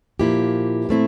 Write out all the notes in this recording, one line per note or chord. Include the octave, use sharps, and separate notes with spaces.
A#2 F3 A#3 E4 G4
A#2 A3 C4 E4